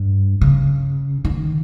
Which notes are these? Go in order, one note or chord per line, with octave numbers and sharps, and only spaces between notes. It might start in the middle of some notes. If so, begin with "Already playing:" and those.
Already playing: G2
C#3
D#3